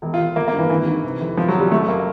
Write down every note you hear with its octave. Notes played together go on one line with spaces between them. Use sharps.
E1
F4
E1
G1 A#3
A#3
G2
E3
G#1 E3
D#3
C3
F1
C2 F3
F#3
C2
G3
F#1 A3
A#3